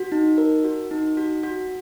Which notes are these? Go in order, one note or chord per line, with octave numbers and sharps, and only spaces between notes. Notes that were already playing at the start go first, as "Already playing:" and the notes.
Already playing: F#4
D#4
A#4
F#4
D#4
F#4
F#4